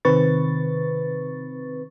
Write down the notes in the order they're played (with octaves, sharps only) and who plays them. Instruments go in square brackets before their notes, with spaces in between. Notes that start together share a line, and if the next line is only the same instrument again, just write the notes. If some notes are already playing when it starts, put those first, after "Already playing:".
[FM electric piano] C3 D#3 C4 B4 C#6 A6